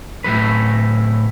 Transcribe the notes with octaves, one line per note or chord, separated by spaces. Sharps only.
A2 F#3 B4